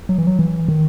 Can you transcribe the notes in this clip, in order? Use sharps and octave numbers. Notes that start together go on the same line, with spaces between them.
F#3
E3
F#3
E3
D#3